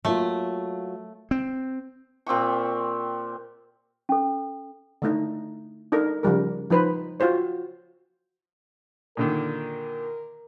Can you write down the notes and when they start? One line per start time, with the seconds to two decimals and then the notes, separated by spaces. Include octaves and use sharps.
0.05 F#3 A3 A#3 F4
1.31 C4
2.26 A#2 C4 G4 C#6
4.09 C#4 A4
5.02 D3 A3 D#4
5.92 D4 D#4 A4 A#4
6.23 C#3 F3 G3 A#4
6.70 F3 D#4 B4 C5
7.20 F4 F#4 C5 C#5
9.17 A#2 D3 D#3 A#4